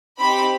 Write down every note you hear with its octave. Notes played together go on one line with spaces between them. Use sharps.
C4 D#4 G4 B5